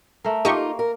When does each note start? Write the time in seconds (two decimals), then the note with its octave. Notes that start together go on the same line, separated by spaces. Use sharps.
0.25 A3 A#4
0.45 A#3 D#4 F4 G4 D#5 C#6
0.79 A#4